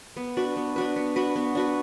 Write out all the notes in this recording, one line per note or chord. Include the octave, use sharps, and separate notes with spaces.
B3
D4 F#4 B4
B3
D4 F#4 B4
B3
D4 F#4 B4
B3
D4 F#4 B4